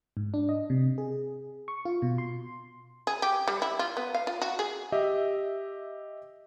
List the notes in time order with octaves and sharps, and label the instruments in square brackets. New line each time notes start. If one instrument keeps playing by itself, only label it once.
[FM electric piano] G#2
D4
D#5
C3
G#4
C#6
F4
B2
C6
[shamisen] G#4
G4
G3
E4
F4
B3
F5
F4
F#4
G#4
[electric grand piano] G4 D#5 E5